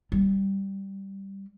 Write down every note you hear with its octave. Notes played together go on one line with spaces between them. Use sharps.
G3